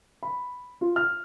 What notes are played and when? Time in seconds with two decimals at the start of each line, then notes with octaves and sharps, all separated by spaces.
0.23 B5
0.81 F4
0.96 F6